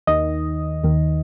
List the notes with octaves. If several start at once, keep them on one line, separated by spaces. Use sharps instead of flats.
D#2 D#3 D#5
D#2 D#3